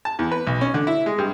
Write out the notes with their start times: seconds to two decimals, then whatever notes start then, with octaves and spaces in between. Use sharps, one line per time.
0.05 A5
0.19 E2
0.32 B4
0.47 B1
0.61 C#4
0.74 D3
0.87 E4
1.06 G#3
1.18 G2